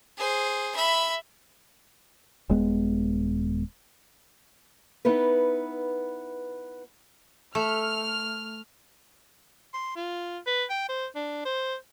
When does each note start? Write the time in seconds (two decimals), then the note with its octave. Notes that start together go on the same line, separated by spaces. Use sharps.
0.17 G#4 C5
0.75 E5 B5
2.49 D#1 G#3 B3
5.05 B3 D#4 E4 B4
7.55 A3 F6
9.74 C6
9.96 F4
10.46 B4
10.70 G5
10.89 C5
11.15 D4
11.45 C5